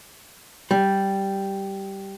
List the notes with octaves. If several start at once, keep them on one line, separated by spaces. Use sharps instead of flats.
G3